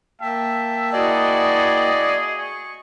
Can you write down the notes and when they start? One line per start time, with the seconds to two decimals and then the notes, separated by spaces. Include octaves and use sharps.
0.21 A#3 E5 G5 A5
0.93 E4 F#4 G#4 D5 D#5
2.39 C#6